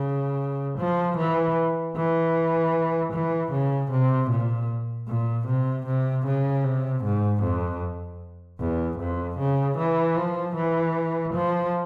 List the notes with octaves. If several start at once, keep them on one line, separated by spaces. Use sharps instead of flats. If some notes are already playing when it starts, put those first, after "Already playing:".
Already playing: C#3
F3
E3
E3
E3
C#3
C3
A#2
A#2
C3
C3
C#3
C3
G#2
F2
E2
F2
C#3
E3
F3
E3
F3